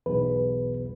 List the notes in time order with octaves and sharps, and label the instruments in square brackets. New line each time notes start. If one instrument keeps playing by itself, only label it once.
[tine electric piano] B1 E2 [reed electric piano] B4